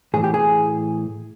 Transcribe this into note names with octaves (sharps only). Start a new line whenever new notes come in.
A2 E3 G#4
G4
G#4